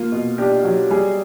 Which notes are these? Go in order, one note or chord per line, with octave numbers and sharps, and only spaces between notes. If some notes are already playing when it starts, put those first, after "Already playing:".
Already playing: A#3 F4
B2
D4 G4
F#3
G3 G#4